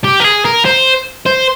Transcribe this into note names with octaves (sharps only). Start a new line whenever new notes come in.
G4
A#4
G#4
A#4
C5
C5